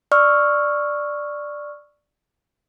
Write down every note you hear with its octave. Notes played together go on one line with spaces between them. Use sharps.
D5 C#6 E6 F6